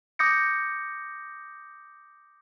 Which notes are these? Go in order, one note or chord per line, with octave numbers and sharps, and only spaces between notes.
D6 D#6 G6 A#6 C#7